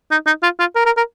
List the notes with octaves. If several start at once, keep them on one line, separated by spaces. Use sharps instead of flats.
D#4
D#4
F4
F4
A#4
A#4
A#4